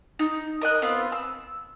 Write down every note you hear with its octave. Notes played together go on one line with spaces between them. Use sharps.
D#4
A#4 D#5 F#6
B3 C4 F4
E6